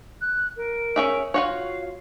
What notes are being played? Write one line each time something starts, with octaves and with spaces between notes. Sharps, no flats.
F#6
A#4
C#4 G#4 E5
F4 F#4 C#5 F5